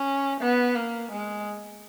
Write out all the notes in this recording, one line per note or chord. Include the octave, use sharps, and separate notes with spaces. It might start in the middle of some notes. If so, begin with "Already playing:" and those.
Already playing: C#4
B3
A#3
G#3